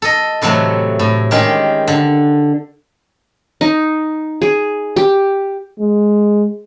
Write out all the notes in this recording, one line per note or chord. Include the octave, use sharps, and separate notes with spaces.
A4 D#5
A2 C3 E3 F#3 A3
A2
D#3 G#3 C#4 D#4 G4
D3
D#4
G#4
G4
G#3